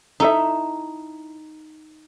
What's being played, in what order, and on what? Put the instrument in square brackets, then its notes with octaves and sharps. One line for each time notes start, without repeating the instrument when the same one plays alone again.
[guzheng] D#4 [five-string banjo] E4 A4 E5